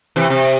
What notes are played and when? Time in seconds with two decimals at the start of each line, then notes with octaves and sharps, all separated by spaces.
0.16 C3 E3
0.30 C3